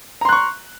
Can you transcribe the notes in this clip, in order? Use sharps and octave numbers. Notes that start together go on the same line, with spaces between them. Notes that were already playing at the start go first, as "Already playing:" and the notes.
A#5 C6 C#6 F#6